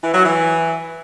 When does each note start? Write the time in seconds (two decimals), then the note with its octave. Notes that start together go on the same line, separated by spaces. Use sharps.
0.02 E3
0.13 F#3
0.23 E3